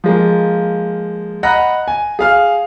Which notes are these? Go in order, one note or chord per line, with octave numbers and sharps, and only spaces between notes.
F3 G#3 A#3
D#5 F#5 A#5 B5 F#6 A#6
G#5
G#4 F5 F6